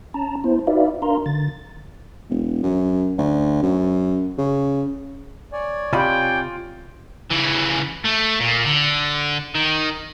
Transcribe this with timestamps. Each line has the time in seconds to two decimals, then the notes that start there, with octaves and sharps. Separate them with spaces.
0.14 C#4 A5 A#5
0.44 B3 E4 C5
0.67 D#4 F#4 B4 D5 E5 F5
1.02 D4 A#4 F5 A#5 C6
1.26 D3 A6
2.29 E1
2.63 F#2
3.18 D2
3.62 F#2
4.38 C#3
5.53 C#5 D5 G#5
5.93 C3 F4 D#5 G5 B5
7.30 C#3 E3
8.05 A3
8.41 A#2
8.65 D3
9.55 D#3